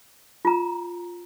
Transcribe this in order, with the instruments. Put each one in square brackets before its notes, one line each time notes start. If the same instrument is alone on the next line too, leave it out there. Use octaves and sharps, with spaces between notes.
[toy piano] F4 A#5